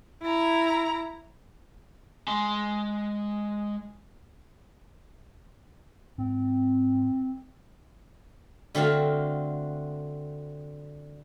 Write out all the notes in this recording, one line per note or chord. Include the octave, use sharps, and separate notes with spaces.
E4 A#5
G#3 C6
G#2 C4
D3 A3 C4 F#4 A4 F5